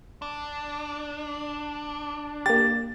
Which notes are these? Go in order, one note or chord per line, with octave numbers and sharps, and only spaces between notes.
D4
A#3 G4 A6